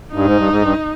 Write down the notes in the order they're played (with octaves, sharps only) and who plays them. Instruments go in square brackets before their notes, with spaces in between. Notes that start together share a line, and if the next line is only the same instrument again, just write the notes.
[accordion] G2 [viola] D#4
[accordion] G#2
G2
G#2
G2